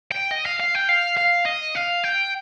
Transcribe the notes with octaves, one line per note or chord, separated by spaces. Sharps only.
G5
D#5
F5
F5
G5
F5
F5
D#5
F5
G5